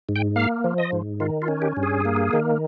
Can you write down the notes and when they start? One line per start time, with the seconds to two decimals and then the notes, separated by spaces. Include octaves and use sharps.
0.09 G#2
0.16 G5
0.36 A#3 F5
0.64 F3
0.78 D#5
0.92 G#2
1.20 D#3 F4
1.42 F4
1.48 C#4
1.62 G4
1.77 G2
1.83 G#4
2.05 A#3
2.33 D#3